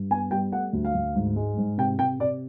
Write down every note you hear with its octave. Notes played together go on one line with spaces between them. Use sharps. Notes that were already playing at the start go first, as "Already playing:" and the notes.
Already playing: G2
B3 G#5
G3 G5
A3 F#5
D2
F5
D2
G#2
G#3
G#2
C3 G5
C3 G5
C3 D5